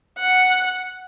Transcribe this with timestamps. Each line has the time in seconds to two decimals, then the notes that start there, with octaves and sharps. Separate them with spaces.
0.19 F#5